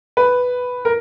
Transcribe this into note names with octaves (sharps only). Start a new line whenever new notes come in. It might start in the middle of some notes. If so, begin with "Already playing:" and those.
B4
A#4